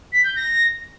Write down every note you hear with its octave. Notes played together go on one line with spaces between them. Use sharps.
B6
G6
A#6